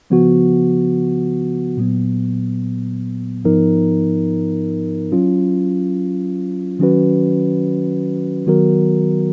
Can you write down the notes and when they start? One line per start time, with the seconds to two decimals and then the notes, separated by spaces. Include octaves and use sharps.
0.10 C#3 F3 B3 F#4
1.77 A#2 F#3 B3
3.45 G#2 F3 B3 D#4 A#4
5.12 F#3 C#4 F4
6.79 D#3 F#3 C#4 F#4 B4
8.47 D#3 F#3 B3 F#4 A#4